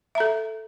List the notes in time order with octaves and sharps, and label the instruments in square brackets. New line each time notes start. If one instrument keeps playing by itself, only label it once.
[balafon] E5
A#5
A4